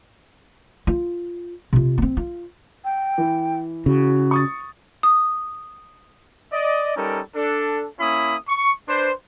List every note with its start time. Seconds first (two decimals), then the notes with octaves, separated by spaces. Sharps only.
0.87 F4
1.73 C3 F4
1.98 B3 C4
2.17 F4
2.85 G5
3.18 E3
3.86 C#3 F#4
4.31 C#6 D#6 A6
5.03 D#6
6.52 D5 D#5
6.96 G3 C#4 D#4 A4 A#4
7.35 D4 A4
8.00 A#3 C#4 E4 B5 D#6
8.49 C#6
8.88 D4 B4 C5